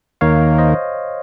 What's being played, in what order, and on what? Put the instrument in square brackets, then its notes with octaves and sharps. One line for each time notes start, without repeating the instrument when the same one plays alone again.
[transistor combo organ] D#2 D#3 A#3 [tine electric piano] C#5 F5
[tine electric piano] C5 D#5